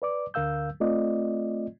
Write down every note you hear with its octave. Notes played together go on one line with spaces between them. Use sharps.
B4 D5 D6
D2 D3 A#4 F5 E6 G6
A3 C4 F4 D5 D#5